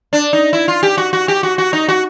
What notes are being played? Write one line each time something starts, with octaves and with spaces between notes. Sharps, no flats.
D4
D#4
E4
F4
G4
F#4
F#4
G4
F#4
F#4
D#4
F#4